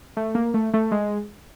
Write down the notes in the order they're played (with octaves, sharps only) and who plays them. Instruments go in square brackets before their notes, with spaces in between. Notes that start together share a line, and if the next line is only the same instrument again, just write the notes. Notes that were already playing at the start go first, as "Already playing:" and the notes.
[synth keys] A3
A#3
A3
A3
G#3